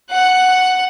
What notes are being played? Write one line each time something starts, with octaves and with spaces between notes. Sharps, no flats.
F#5 F#6